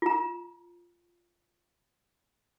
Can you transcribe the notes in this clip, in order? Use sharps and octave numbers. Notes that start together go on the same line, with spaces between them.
F4 A#5